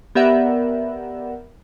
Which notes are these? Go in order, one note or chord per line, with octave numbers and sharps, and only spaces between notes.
B3 G4 A#4 D5 E5 F#5